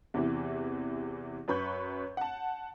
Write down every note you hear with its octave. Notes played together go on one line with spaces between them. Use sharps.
E2 C3 E3
F#2 B4 B5 C#6 G6
F#5 A5